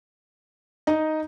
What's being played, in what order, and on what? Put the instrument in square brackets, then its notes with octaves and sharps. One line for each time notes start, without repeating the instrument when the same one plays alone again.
[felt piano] D#4 D#5